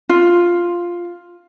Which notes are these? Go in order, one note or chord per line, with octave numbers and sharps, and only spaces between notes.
F4